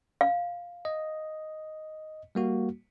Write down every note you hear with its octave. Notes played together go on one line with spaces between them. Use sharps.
F5
D#5
G3 A#3 F#4